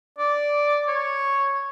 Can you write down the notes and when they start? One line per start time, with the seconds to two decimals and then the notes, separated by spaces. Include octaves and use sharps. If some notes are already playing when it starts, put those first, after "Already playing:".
0.19 D5
0.88 C#5